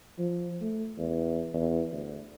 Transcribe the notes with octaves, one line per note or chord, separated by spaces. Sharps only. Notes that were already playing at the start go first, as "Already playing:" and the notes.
F3
A3
E2
E2
D2